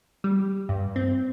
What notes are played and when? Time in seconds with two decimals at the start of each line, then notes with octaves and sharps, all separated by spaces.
0.24 G3
0.69 G2
0.96 C4